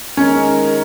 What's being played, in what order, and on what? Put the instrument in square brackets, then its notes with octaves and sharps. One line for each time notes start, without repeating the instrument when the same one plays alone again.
[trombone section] D#3 G#3 D#4 A#4 [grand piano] C#4